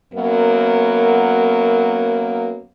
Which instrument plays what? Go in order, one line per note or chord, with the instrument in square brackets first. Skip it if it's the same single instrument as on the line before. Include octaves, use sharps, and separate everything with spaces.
[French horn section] F#2 F#3 A#3 B3 A#4